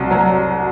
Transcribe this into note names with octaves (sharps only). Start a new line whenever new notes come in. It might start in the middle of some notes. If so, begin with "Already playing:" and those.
Already playing: C2 F#3
F#3